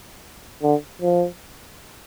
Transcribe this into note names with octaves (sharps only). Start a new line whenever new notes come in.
D3
F3